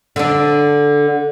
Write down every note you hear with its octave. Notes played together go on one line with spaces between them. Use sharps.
D3 D4